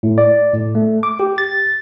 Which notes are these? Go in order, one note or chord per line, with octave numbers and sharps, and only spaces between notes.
A2
D5
A2
A3
D6
G4
A6